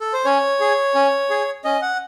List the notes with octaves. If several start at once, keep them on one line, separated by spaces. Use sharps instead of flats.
A4
C5
C#4 C#5
G#4
C#4
G#4
C#4 D#5
F#5